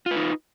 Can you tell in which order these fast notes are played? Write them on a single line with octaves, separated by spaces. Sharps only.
F4 B4 D#4